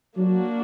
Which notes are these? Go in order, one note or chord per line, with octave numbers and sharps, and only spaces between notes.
F#3 A#3 D4 F#4